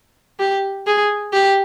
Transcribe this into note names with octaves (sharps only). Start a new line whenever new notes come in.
G4
G#4
G4